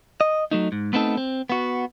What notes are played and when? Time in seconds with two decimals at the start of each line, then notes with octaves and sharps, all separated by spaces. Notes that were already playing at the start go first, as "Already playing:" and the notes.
0.21 D#5
0.51 F#3 A3 D#4
0.72 G#2
0.93 A3 B3 C4 D#4 A4
1.17 C4
1.50 B3 F#4